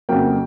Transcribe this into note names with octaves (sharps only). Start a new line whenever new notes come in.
F2 C#3 F#3 A#3 G5